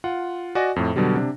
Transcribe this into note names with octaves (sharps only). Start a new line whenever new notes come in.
F4 F#5
F#4 D5 D#5 G#5 A#6
F2 A2
B2 D3 F#3 G3
C3 D4